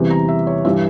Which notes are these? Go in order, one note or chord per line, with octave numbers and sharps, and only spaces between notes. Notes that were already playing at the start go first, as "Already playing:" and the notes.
Already playing: E2 C3 E3 G3
A#5
E5
C#5
G2 E3 G3 E5